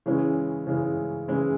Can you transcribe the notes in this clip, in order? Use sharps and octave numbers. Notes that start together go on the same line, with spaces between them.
C#3 E3 G#3 C#4 E4
C#3 E3 G#3 C#4 E4
C#3 E3 G#3 C#4 E4